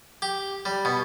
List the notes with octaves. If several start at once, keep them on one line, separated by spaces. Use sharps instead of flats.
G4
G3
B2